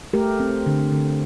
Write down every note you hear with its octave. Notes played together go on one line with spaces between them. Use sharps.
A3 G4 A#4
C4
D3
D3